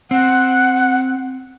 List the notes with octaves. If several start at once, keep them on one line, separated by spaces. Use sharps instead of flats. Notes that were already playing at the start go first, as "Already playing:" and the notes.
C4 F#5